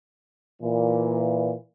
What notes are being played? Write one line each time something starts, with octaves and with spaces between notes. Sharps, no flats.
A#2 E3